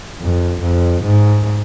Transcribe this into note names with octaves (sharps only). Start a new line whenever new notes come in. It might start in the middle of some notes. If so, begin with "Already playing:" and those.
F2
F2
G#2